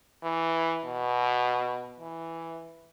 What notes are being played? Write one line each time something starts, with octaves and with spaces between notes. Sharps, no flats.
E3
B2
E3